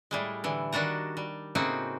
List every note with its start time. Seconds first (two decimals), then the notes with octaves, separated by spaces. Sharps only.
0.11 A2 G3 G#3
0.44 D3 E3
0.72 D#3 G3 D4 F#4 A#5
1.17 G3
1.55 A2 C#3 A#3 C4 D#4 F#4